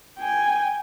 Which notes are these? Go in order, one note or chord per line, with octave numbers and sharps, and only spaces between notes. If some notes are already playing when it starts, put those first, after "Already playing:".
G5 G#5